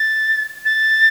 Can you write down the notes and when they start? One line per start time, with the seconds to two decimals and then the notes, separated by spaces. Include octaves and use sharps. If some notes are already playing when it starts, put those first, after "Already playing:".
Already playing: A6
0.65 A6